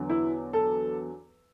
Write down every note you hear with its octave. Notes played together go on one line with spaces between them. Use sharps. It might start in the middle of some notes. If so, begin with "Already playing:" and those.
Already playing: E2 D3 F#3
E4
A4